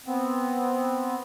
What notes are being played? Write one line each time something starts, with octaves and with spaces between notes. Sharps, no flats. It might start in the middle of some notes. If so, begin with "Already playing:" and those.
B3 C4